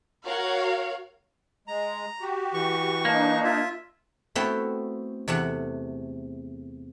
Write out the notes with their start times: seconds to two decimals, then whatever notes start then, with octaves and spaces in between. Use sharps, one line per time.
0.24 F#4 A#4 C#5 F5 F#5
1.68 G#3 A#5
2.21 F#4 G4
2.54 E3 C#6
3.05 A#3 D4 D#4
3.44 F4 E5
4.35 A3 B3 C4 E4 F#4 C5
5.28 E2 C3 A3 F#5